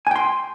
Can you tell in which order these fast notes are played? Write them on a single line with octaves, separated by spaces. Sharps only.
G#5 G5 C6